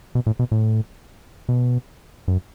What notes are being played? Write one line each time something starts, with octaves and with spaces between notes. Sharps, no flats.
B2
A2
B2
A2
B2
F#2